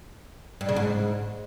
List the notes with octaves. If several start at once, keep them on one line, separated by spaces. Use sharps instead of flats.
G2
C#3
G#2